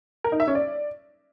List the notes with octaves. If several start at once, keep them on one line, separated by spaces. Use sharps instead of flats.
A#4
D#4
E5
C#4
D5